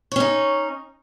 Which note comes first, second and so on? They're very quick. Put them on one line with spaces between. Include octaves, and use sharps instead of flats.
C#5 C#4 D#4